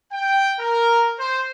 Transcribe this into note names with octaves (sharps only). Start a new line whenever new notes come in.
G5
A#4
C5